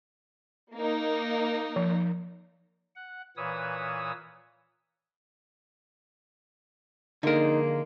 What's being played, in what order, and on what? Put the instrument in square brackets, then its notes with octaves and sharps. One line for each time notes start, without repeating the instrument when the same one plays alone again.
[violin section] A#3 D#4
[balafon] F3
[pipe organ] F#5
A#2 E3 B4 C#5 D#6 E6
[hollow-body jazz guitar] D3 A#4 [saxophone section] F3 G#3 A#3 [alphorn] D#4